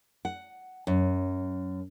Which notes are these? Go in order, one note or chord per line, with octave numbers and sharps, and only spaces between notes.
F#5
F#2